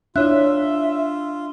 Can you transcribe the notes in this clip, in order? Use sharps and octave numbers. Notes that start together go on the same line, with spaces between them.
D4 E4 F4 C#5 E5 F#6